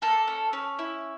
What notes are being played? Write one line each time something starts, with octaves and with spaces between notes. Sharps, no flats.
A#3 A4
C#4
C#4
E4